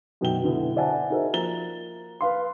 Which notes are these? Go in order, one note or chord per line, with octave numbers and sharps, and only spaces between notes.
F#2 B2 D#3 G5 G7
B2 D3 B3 E4
C5 D5 E5 F#5 G#5 A5
D#4 F#4 G#4 A#4 C5 E5
F3 A#3 A#5 A6 G7
B4 F5 C6